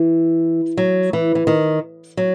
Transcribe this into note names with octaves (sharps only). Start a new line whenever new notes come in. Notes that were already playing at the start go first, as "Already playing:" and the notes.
Already playing: E3
F#3
E3
E3
D#3
F#3